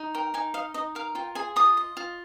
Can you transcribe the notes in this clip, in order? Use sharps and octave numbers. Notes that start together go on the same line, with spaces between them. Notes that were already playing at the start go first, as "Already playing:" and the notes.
Already playing: D#4
A#4 G5
D#4 G#5
D#5 F5
D#4 D#5
A#4 F5
F4 G5
G#4 G#5
F4 D#6
D#5
F4